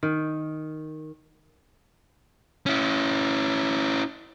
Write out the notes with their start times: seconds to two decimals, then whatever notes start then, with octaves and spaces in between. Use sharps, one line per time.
0.03 D#3
2.66 C#4 E4